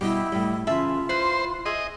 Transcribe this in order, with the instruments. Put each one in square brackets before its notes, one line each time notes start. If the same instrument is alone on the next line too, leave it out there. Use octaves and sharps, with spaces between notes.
[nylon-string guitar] B2 G3 [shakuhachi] E4 [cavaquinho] G4 D#5 G5
[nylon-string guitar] A2 G3 [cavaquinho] D#5
[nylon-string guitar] C#3 E3 [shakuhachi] F4 [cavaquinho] E5 A5 B5
[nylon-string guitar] E4 [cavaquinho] B4 B5 [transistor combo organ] C5
[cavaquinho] G#4 C5 E5 [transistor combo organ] D#5